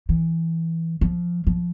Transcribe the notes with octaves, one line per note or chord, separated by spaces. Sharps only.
E3
F3
F3